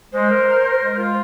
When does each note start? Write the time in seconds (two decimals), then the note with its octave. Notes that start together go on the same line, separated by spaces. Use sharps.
0.13 G#3 C5
0.30 A#4
0.48 A#4
0.64 A#4
0.81 G#3
0.99 F4